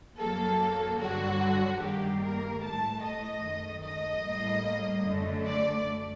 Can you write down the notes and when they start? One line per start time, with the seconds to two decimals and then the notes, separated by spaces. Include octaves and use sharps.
0.18 F#2 F#3 A#3 A4
1.00 G2 D3 F#3 F#4
1.81 G2 D#3 G3 A#3 G4
2.21 A#4
2.62 A2 A3 A5
3.02 D#5
3.43 F#2 D#3 A3
3.83 D#5
4.24 A2 G3 A#3
5.05 F#2 D3 A3
5.45 D5